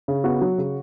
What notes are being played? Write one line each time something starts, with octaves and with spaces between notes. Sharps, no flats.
C#3
B3 F#4
F#3
C#3